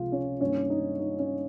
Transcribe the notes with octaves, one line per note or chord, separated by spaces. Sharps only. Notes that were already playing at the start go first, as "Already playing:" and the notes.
Already playing: C#2 C3 F3 G#3 F4
C#4
G2 D#3 A#3 C#4
D#4
D#4
C#4